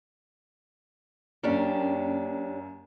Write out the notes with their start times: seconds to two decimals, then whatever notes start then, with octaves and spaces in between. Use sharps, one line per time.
1.43 F#2 A#3 C#4 D4 G4